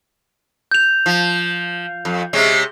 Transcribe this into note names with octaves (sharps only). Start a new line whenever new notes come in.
G6 F7
F3
F2
C3 G#3 C#4